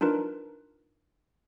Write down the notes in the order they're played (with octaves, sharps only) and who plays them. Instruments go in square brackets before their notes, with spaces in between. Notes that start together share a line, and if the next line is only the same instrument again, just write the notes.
[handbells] D4 D#4 F4 A#4 B4